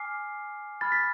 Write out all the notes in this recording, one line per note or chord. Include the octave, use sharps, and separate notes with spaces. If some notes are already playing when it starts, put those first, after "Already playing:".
Already playing: G#5 D6 F6 C7
B5 F6 A6
B6